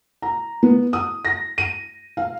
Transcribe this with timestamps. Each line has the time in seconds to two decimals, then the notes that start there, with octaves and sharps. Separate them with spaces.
0.22 A#5
0.63 B3
0.93 D#6
1.25 A#6
1.58 D#7
2.17 F5